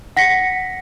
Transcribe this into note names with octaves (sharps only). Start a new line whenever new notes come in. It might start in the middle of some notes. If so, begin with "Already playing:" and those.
F#5 A#6 B6 C#7